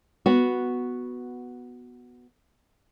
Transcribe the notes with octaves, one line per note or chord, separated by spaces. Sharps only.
B3 F#4